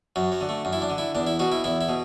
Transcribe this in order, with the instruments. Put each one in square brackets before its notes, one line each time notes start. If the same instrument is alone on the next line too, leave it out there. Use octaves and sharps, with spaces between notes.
[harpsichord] F#2 F#3
F#3
D3
A3
F#2
E4
D4
D3
E4
E2 D4
E4
B2 F#4
E4
E2 E4
E4
B2